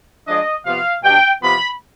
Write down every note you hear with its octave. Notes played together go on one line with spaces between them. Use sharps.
F3 G#3 D4 D#5
C3 F3 B3 F5
B2 G3 D4 G5
C3 F3 B3 B5